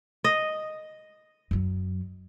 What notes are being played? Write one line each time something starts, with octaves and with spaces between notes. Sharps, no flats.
D#5
F#2 F#3